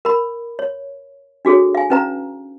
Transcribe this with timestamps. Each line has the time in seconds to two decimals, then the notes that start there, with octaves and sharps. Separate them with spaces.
0.05 A#4 B5
0.59 C#5
1.45 D4 F#4 G#4 A4 C#5
1.75 F5 G#5
1.90 C#4 D#4 B4 F5 A#5